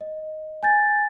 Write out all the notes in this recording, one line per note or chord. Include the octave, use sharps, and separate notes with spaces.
D#5
G#5 G6 A6